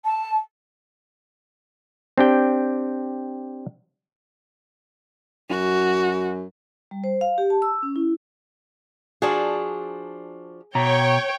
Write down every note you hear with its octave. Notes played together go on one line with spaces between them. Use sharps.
A5
C4 D4 G4 G5
F#2 F#4
G3
C5
F5
G4
A5
E6
C#4
E4
F3 D4 F#4 G#4
B2 C#5 G5 A#5